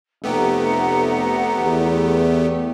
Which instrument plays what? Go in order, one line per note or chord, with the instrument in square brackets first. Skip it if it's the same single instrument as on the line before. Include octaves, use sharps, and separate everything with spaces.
[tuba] F1 [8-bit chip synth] A3 B3 G4 [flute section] F#5 A#5
[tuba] E2